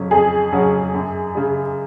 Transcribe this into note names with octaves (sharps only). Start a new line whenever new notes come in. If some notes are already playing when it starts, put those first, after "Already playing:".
Already playing: F2 C#3 F#3 C#4
F2 G#4
C#3 F#3 C#4 F#4
F#2
C#3 G#3